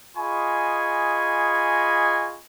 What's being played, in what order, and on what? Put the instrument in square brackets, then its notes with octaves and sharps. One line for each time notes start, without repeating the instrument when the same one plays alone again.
[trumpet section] F4 G#4 D#5 G#5 B5 C#6